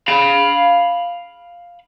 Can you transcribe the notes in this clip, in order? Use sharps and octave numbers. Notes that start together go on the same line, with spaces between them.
F5 B5